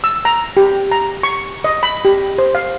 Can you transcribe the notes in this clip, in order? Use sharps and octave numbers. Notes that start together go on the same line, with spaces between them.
E6
A#5
G4
A#5
C#6
D#5
B5
G4
C5
F5